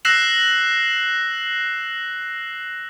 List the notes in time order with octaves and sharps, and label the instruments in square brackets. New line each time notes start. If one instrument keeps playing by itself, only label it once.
[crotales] E6 F#6 A#6 C7 E7 F#7